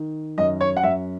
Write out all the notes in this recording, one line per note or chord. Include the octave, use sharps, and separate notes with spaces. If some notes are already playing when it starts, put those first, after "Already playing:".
Already playing: D#3
F#2 D#5
C#5
F#5
F#2 E5